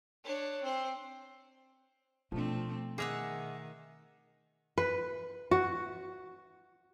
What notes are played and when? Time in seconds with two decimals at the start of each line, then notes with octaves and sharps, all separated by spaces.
0.24 D4 C#5
0.63 C4 C5
2.32 B2 F3 A3 C4 D4
2.98 D#3 G#4 E5 F#5 D6 A#6 F7
4.78 B4
5.51 F#4